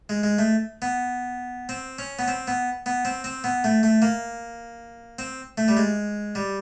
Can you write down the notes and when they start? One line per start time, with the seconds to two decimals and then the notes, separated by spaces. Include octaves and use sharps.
0.09 G#3
0.23 G#3
0.39 A3
0.82 B3
1.69 C4
1.99 C#4
2.19 B3
2.28 C4
2.48 B3
2.86 B3
3.05 C4
3.24 C4
3.44 B3
3.64 A3
3.83 A3
4.02 A#3
5.19 C4
5.58 A3
5.68 G3
5.77 G#3
6.35 G3